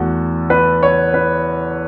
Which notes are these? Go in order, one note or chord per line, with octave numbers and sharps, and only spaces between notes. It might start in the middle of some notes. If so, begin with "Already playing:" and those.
Already playing: E2 A3 F#4 A4
B4
C#5
B4